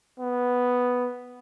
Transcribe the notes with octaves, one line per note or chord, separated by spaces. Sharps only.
B3